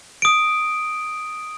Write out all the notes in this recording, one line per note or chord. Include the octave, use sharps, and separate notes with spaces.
D#6 D7